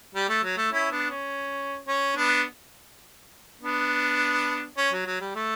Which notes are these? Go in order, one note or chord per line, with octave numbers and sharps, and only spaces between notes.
G3
A3
F#3
A3
C#4 E4
B3 D4
C#4
C#4
B3 D4
B3 D4
C#4
F#3
F#3
G3
A3